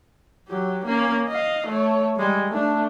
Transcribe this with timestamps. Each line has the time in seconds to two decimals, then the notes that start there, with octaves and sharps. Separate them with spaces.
0.48 F#3 G4
0.85 A#3 C#4
1.28 D#5 F5
1.67 A3 C#5
2.17 G3 G#3
2.48 A3 D4